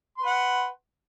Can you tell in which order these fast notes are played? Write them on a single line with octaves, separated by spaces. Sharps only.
C6 B4 F#5